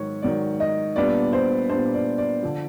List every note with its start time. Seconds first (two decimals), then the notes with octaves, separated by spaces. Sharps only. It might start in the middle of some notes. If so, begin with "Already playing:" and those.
Already playing: G#2 D#3 F#3 C#5
0.22 G#2 D#3 F#3 D5
0.60 D#5
0.96 A#2 G3 B3 D4 D5
1.33 C5
1.69 A#2 G3 B3 D4 C5
1.94 D5
2.18 D5
2.43 D3 F3